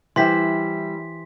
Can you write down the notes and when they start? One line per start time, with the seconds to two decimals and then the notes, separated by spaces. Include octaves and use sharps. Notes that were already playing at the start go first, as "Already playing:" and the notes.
0.16 E3 G3 E4 G4 C5 C6 B6